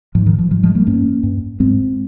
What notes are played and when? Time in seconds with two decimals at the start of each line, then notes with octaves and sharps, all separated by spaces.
0.15 G#2 F3
0.27 D#3
0.39 F3
0.51 G#2 F3
0.63 F3 G#3
0.75 G3 A#3
0.87 G2 A#3 C#4
1.23 G2
1.60 G#2 G#3 C4